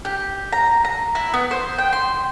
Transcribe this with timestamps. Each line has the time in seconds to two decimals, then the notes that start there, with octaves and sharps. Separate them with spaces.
0.05 G4
0.53 A#5
0.85 A#5
1.15 E4
1.34 B3
1.51 C5
1.79 G5
1.93 C6